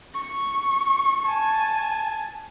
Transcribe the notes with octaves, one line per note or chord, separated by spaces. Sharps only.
C#6
G#5 A5